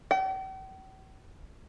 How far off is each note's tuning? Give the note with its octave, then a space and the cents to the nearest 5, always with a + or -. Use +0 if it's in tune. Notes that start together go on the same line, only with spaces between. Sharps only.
G5 -45